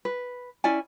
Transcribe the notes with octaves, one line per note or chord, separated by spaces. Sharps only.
B4
C#4 E4 D5 G#5